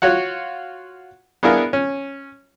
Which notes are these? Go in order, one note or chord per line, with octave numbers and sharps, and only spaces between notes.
F4 F#4 C#5 F#5
B3 D4 E4 G#4 A#4 F5
C#4